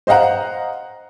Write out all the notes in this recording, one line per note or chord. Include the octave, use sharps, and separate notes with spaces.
C5 D#5 F5 F#5 A#5